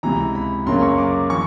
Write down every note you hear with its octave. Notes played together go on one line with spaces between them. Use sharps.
C#2 C3 E3 A#5
B5
F#2 C#3 F#3 A#3 C6
C#6
D6
E3 C#6